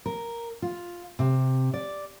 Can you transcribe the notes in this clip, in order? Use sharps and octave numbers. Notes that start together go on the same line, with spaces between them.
A#4
F4
C3
D5